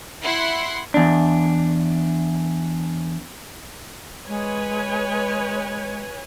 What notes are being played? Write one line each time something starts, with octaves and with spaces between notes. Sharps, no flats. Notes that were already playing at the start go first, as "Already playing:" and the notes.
E4 F#5 C6
E2 D4
G#3 B4 C#5 G#5